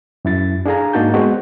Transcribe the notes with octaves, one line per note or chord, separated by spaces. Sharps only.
F#2 E4 A6
D4 G#4 A4 F5 G#5 A#5
G#2 A#3 D#4 F#4 A5 G6
G#3 B3 C4 F#4 A4